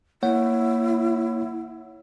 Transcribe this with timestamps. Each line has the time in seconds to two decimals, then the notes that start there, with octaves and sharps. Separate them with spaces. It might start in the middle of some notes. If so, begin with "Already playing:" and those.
0.23 A#3 E4 C#5 F#5